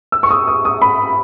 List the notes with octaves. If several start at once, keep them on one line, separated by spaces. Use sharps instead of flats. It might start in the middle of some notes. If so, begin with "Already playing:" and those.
E6
C#6
D#6
D#6
D#6
B5